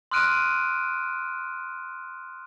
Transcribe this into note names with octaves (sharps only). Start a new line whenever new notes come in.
C6 D#6 F6 F#6 D7 D#7